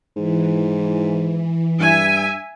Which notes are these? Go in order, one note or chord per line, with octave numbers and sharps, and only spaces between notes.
G#2 E3
G2 E5 G#5